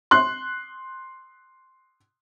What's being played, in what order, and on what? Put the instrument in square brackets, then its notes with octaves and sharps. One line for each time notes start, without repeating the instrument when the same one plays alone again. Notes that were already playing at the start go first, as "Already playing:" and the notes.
[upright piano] C6 F#6